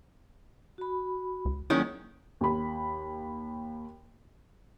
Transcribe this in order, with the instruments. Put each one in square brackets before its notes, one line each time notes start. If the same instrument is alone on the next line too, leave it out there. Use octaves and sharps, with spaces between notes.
[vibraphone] F#4 B5
[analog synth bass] C#2
[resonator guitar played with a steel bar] D#3 G#3 C#4 [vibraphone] F#3 A#3 [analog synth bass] E4
[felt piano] D#2 B5